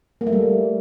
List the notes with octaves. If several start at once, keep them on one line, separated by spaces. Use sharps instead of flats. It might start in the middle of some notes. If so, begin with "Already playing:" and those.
A#3
A3
G3